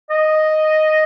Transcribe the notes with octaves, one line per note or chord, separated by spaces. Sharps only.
D#5